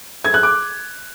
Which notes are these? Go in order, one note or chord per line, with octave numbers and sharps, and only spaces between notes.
G#6
F#6
D6